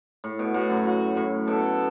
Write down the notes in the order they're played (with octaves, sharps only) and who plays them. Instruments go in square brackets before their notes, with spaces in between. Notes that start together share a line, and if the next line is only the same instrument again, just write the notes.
[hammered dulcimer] A2
B2
[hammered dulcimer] A2 [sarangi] F#4
[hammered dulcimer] F#2
[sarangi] F#4
[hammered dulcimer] A2
[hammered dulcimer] B2 [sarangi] A4